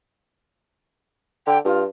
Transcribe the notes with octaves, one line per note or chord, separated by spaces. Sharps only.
D3 G5
G2 F4